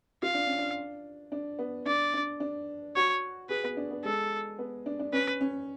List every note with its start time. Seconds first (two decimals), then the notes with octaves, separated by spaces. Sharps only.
0.23 F4 F5
0.34 D4
0.47 C#4
0.58 D4
1.32 D4
1.59 B3
1.86 D4 D5
2.14 D4
2.40 D4
2.96 F#4 C#5
3.49 G#4 B4
3.64 B3
3.77 D4
3.91 B3
4.04 G#3 A4
4.59 B3
4.86 D4
4.99 D4
5.13 C#4 B4
5.41 C#4